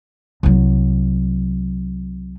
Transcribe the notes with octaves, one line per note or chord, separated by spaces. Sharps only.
C2 F#3